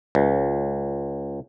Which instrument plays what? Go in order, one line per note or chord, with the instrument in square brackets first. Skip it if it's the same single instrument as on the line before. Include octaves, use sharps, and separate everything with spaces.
[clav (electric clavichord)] C#2